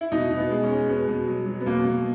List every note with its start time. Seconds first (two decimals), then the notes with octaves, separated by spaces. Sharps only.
0.01 E4
0.12 B2 D#4
0.31 B2
0.37 B3
0.51 G#3
0.64 C#4
0.69 G#3
0.89 B2 B3
1.08 B2
1.28 F#3
1.46 F#3
1.60 B3
1.66 B2 A#3
1.85 B2